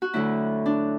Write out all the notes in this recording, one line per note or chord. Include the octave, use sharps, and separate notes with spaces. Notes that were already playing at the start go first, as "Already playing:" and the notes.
F#4
D2 D3 F#3 A3 E4
D4